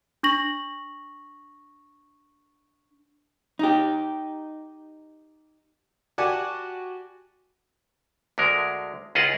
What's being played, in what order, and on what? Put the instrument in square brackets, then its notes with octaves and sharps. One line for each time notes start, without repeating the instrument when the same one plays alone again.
[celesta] D4 C#6 A#6 F#7
[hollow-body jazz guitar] D#4 G4
[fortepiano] F#4 G4 D5 F#5 G#5 A5
[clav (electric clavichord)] D2 D3 G#3 A#4
C#2 E4 F4 G#4 D#5 F#5